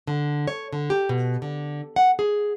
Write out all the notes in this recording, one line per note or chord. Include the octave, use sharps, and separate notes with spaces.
D3
C#5
D3
G4
B2
D3
F#5
G#4